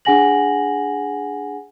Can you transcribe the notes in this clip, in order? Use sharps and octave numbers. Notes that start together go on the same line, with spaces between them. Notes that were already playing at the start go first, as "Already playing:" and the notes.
D4 G#4 F#5 G#5 A#6 F#7